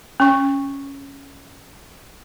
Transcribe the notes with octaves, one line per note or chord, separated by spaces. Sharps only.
C#4 C#6